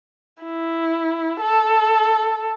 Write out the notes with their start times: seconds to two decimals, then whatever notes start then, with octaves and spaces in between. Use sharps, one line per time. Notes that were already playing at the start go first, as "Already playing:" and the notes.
0.43 E4
1.41 A4